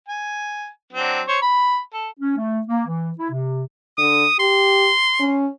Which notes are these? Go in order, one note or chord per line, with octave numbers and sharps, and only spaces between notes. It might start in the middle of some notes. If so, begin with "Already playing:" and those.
G#5
F#3 C4 D4
C5 C#5
B5
A4
C#4
A3
A#3
E3
E4
C3
D3 D#6
G4 C6
C#4